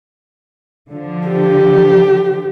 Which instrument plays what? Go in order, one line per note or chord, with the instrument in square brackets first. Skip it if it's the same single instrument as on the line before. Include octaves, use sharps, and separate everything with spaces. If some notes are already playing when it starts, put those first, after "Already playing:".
[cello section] D3 F3
[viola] G4